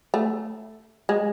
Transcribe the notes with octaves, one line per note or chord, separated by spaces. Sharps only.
A3
G#3